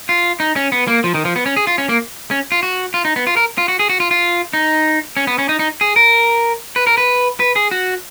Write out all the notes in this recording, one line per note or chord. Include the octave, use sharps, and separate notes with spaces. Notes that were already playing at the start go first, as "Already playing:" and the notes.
F4
D#4
C#4
B3
A#3
F3
D#3
F3
B3
C#4
G#4
F4
C#4
A#3
C#4
F4
F#4
F4
D#4
B3
F4
A#4
F4
F#4
G#4
F#4
F4
F4
D#4
C#4
B3
C#4
D#4
D#4
G#4
A#4
B4
A#4
B4
B4
G#4
F#4